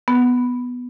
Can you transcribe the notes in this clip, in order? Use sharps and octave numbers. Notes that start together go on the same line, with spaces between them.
B3